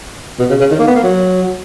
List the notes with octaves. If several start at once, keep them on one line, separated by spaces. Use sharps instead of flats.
B2
C#3
C#3
D#3
A#3
B3
A#3
F#3